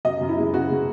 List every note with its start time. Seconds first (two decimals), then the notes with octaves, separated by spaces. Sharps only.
0.05 F#2 D#5
0.21 F#2
0.29 E4
0.37 G#3
0.54 C#3 F#4
0.69 G#3